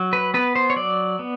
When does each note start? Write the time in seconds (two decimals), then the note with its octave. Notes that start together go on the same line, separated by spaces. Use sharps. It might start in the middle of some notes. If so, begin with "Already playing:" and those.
Already playing: F#3
0.13 B4
0.34 B3 B4
0.56 C5
0.70 C#5
0.76 F#3 D5
1.19 B3